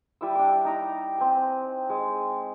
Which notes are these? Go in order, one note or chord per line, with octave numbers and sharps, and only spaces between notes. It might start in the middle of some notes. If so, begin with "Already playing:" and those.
G3 E4 E6
D4 G5 D6
D#4 A#5 D6
C4 G#5
G#3